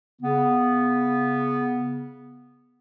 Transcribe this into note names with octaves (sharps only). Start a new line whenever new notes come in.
C#3 B3